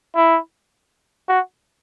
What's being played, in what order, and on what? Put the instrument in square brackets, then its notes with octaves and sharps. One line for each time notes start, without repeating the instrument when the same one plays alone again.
[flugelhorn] E4
F#4